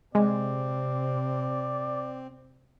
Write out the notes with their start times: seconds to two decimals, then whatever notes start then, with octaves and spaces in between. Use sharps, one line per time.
0.15 C3 G#3 C4 D5